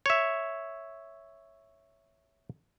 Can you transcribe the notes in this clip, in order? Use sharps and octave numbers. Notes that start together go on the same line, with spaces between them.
C#5 E5